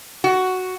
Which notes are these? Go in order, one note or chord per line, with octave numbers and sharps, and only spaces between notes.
F#4